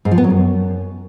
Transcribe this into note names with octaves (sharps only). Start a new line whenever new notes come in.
G#2
F3
B3
F#3
F#2